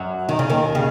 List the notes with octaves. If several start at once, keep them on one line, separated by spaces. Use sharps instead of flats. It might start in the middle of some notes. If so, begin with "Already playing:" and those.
Already playing: F#2 F#3
D#3
C#3
D#2 D#3
C#3